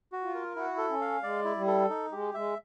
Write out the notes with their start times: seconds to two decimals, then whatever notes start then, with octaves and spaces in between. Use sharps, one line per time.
0.12 F#4
0.23 F4
0.34 A#4
0.56 E4 F#4
0.78 A4
0.89 C#4
1.01 F5
1.22 G#3 D5
1.45 E4
1.56 G3
1.67 A4
1.90 D#4
2.12 G#3 G4
2.34 G#3 E5